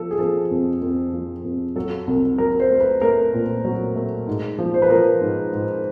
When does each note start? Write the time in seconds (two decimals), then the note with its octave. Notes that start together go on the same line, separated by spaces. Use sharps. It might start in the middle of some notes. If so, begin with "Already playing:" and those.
Already playing: F3 A4
0.11 G#4
0.18 F3 A4
0.51 F2
0.82 F2
1.13 F3
1.44 F2
1.76 F#3 A4
2.07 C2
2.38 F#3 A#4
2.60 C5
2.70 A3
2.81 B4
3.02 A3 A#4
3.33 A#2
3.65 F#3
3.96 A3
4.27 G#2
4.58 F3
4.74 C5
4.82 B4
4.90 F3 A#4
5.21 G#2
5.53 G#2